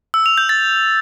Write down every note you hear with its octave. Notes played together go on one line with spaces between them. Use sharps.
E6
F7
G6
A6